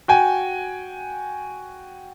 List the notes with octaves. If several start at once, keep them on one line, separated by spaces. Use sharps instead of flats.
F#4 G5 G#5